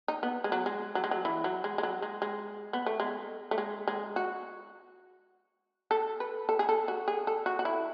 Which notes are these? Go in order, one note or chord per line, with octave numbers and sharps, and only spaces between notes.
D#4
B3
G#3
F#3
G#3
F#3
G#3
F#3
E3
F#3
G#3
G#3
F#3
G#3
G#3
B3
A3
G#3
A3
G#3
G#3
F#4
A4
B4
A4
G#4
A4
F#4
G#4
A4
F#4
F#4
E4